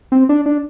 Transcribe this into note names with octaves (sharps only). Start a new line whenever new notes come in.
C4
D4
D4